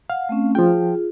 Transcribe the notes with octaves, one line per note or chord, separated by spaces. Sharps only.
F5 F#5
A3 C4 C#4
F3 F4 G#4 G5